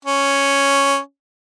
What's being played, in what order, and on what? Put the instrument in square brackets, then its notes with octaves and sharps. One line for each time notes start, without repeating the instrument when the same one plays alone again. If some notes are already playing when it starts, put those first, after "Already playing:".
[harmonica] C#4